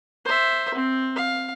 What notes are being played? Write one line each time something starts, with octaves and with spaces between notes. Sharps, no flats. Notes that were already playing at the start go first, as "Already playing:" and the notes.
C5 E5
C4
F5